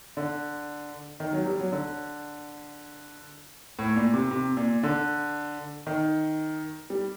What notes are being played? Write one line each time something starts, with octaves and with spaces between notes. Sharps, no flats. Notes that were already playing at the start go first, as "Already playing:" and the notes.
D3
D#3
F#3
G3
F#3
D3
A2
A#2
C3
C3
A#2
D3
D#3
G3